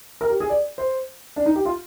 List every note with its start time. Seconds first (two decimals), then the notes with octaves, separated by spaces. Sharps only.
0.21 A#4
0.30 G4
0.40 G#4
0.49 D5
0.78 C5
1.36 D4
1.46 D#4
1.56 G4
1.65 F4